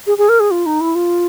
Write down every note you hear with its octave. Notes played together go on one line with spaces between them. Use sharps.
G#4
G#4
A#4
G#4
F4
D#4
E4
F4